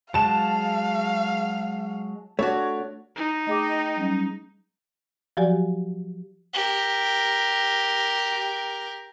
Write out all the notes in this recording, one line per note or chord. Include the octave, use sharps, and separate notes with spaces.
F#3 G#3 F5 A5 E7
A3 D4 F#4 C#5
D#4
A3 G#4 D#5 G5 D6
F#3 G3 C#4
F3 F#3 F#4 G4 D5 G#5
G4 A#4